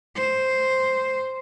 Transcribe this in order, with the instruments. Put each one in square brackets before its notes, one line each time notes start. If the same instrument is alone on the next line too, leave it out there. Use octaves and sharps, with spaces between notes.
[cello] C5